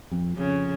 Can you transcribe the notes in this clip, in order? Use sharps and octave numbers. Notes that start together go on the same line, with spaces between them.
F2
F2 C#3